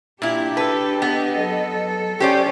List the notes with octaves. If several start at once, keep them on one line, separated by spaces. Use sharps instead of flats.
A#2 D4 E4 G4
A4 B4
B3 D#5
F#3 A4
C#4 G4 C5 D5